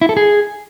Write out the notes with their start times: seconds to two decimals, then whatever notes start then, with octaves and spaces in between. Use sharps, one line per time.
0.01 E4
0.09 A4
0.17 G#4